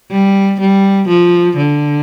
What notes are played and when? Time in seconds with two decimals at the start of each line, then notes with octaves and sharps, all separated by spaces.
0.11 G3
0.60 G3
1.09 F3
1.56 D3